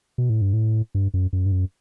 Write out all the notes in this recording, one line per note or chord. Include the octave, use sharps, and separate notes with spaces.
B2
A2
G2
A2
G2
F#2
F#2
G2
F#2